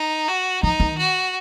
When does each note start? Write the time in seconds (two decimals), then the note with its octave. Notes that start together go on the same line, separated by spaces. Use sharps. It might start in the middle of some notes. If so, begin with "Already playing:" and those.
Already playing: D#4
0.28 F#4
0.63 F3 D#4
0.80 D#3
0.98 F#4